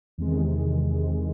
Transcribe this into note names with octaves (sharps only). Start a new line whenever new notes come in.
E2 C3 D#3 G#3